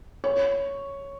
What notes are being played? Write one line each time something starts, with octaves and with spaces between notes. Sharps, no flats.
C#5